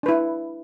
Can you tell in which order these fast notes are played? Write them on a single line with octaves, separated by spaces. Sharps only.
D4 B4 E4